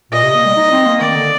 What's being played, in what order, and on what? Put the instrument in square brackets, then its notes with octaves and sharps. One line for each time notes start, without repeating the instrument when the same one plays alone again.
[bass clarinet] A#2 [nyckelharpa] D#5
[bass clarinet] C3
A#3
G3
D#4
C4
A#3
[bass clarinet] D#3 [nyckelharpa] D5
[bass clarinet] D3